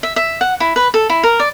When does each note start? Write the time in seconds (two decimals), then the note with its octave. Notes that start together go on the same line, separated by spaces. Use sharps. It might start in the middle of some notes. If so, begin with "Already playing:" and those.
0.03 E5
0.16 E5
0.41 F#5
0.60 E4
0.76 B4
0.94 A4
1.09 E4
1.23 A#4
1.40 D5